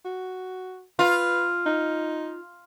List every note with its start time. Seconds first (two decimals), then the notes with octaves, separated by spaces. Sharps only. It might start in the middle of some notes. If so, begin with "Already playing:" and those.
0.05 F#4
0.99 F4 B4
1.66 D#4